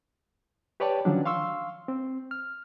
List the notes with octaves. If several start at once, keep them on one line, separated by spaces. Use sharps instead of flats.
G4 B4 C#5 D5 G5 A5
D3 D#3 F3 F#3 C#4 D4
F5 C6 C#6 E6
C4
F6